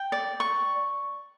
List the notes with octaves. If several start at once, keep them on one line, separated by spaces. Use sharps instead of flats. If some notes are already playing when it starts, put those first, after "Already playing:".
Already playing: G5
D5
C#6